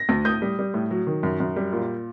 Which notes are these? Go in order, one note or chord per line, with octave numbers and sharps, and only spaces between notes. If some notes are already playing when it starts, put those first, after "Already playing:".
Already playing: A#6
D2
A2 D#6 G6
G3
G3
A2
F#3
D#3
F#2
F#2
G3
A#2